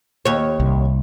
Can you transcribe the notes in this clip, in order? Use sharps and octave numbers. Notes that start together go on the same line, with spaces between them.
D#2 C#5
C2